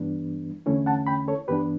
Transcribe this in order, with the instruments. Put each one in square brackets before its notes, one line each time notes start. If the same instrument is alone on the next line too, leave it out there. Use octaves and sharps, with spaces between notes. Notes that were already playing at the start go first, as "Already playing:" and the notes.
Already playing: [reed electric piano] G2 E3 G3 B3 D4
E2 D3 A3 C#4 E4
F#5 A5
G5 B5
A4 C#5
G2 E3 B3 D4 G4 B4